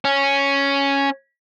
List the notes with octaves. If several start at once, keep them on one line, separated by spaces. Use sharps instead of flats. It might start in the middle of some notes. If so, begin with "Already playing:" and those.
C#4